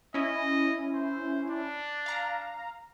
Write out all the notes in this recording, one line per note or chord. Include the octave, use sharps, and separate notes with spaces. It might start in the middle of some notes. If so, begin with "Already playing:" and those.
C#4 E4 D#5
C5
D4
F5 A#5